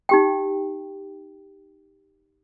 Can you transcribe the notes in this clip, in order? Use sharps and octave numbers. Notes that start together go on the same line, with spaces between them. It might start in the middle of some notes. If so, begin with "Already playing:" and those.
D#4 G4 G5